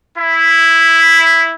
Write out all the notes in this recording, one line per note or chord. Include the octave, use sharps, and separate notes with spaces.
E4